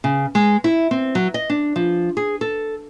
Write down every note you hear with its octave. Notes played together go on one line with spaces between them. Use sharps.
C#3
G#3
E4
C4
F#3
D#5
D4
F3
G#4
A4